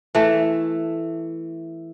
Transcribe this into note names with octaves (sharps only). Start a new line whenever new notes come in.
E3 A3